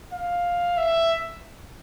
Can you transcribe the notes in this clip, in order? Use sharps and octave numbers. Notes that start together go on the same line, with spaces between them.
F5
E5